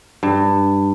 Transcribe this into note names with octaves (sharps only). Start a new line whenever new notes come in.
G2